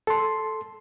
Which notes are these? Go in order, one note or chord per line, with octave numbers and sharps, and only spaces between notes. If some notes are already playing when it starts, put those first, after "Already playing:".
A4 C6